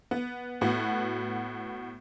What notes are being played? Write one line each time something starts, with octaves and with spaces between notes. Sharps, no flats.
B3
A2 B3 F#4